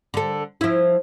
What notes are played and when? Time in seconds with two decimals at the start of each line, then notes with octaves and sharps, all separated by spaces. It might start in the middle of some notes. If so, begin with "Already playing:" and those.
0.14 D3 A4
0.61 F3 E4